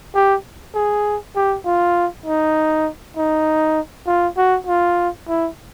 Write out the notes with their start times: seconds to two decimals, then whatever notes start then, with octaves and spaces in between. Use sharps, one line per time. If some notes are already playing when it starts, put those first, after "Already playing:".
0.15 G4
0.75 G#4
1.36 G4
1.65 F4
2.26 D#4
3.17 D#4
4.07 F4
4.37 F#4
4.67 F4
5.28 E4